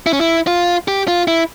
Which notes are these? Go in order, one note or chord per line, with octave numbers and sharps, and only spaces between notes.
E4
C#4
E4
F4
G4
F4
E4